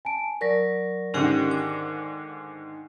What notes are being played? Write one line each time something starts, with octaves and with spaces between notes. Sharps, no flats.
G#5 A5 D7
F#3 A#4 D5 C#6 A#6
G#2 D3 D#3 C#4 G4 G5
D6